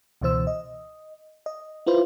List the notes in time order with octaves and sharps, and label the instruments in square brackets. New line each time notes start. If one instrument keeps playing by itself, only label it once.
[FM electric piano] C#2 B2 E3 C5 E6
D#5
D#5
E4 F4 B4 C5